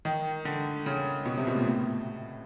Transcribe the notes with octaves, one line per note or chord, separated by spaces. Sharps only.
D#3
D3
C#3
B2
C3
B2
A#2
A2